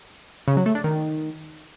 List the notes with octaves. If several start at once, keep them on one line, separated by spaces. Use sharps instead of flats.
C#3
F#3
A3
D4
D#3